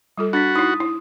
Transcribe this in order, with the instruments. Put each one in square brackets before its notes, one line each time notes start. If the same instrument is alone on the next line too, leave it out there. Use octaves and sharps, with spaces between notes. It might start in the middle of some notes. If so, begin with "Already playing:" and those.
[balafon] G3 F4 A4
[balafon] D4 [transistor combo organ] F#4 [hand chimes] B5 A6 B6
[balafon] D#4 E4 [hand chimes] D#6
[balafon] E4